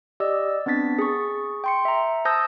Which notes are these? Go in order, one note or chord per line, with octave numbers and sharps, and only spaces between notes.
G4 D5 D#5 E6
B3 C4 D4 A6 B6
G#4 C#6
G5 C6 C#7
E5 A#5
C5 A5 D#6 E6 G6 A#6